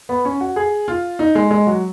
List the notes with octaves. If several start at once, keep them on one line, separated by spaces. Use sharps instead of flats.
B3
C#4
F#4
G#4
F4
D#4
G#3
G#3
F#3